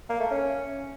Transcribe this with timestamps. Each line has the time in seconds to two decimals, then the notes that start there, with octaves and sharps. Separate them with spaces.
0.09 A#3
0.20 A3
0.31 C#4